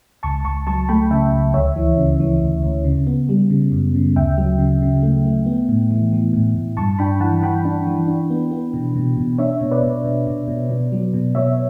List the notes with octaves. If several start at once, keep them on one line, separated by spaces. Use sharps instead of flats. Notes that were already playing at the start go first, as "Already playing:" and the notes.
C#2 A5 C#6
C#2 A5 C#6
F#3 A5 C#6
A3 G5 B5
C#3 E5 G5
C#2
D2 C#5 E5
E3
C#3
E3
D2
D2
C#3
B3
G3
C#3
F#2
C#3
D2 E5 G5
F#3
C#3
C#3
A3
A3
B3
A2
E3
E3
A2
A2
G2 A5 C#6
D4 G5 B5
E3 F#5 A5
E3 G5 B5
D4
E3
D4
B3
B3
B2
B2
B2
D4 C#5 E5
B2
B4 D5
B2
B2
B2
B2
B2
F#3
B2
B2 C#5 E5